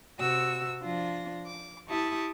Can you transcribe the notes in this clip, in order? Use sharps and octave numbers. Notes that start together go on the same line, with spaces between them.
C3 F#4 E6
F3 D4 F4 A#6
D6
E4 G4 A5 C#6 D#6